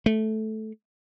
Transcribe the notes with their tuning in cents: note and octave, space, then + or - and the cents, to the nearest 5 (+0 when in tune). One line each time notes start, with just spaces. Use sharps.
A3 -10